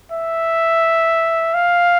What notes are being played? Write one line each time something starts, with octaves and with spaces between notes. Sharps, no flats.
E5
F5